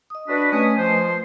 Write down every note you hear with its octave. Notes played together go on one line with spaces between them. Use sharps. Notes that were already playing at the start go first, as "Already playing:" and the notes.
D#5 D#6
D4 F#4 B4
A3 C#4 B4 D#5 G#5 D#6
F3 C5